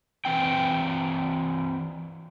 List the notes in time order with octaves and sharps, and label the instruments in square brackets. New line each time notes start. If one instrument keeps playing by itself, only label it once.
[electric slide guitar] E3 C4 G5